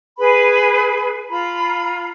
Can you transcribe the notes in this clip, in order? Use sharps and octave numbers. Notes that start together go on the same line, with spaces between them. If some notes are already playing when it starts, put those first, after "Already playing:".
G#4 B4 B5
F4 A#5 B5